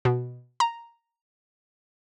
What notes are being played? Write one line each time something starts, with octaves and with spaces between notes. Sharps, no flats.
B2
A#5